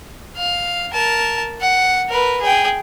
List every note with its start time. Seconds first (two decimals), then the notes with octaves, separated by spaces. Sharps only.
0.37 F5
0.93 A#4 A5
1.61 F#5
2.09 A#4 B4
2.41 G#4 G5